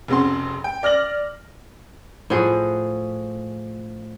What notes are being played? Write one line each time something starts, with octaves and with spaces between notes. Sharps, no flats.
F1 C#3 C4 F#4 C6
G5
D5 F6 A#6 F#7
A2 F3 F#4 G#4